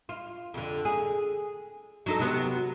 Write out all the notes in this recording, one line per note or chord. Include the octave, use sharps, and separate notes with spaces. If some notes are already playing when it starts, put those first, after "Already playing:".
F4
F2 D3
G#4
F#3 D#4 A4
C3 F#3 B3